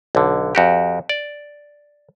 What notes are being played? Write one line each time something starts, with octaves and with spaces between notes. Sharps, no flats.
B1 D3
F2 F#4 G4
D5